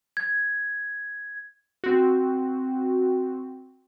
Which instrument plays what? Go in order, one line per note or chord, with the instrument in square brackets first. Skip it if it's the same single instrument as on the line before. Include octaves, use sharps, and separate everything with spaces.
[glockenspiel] G#6
[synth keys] C4 F#4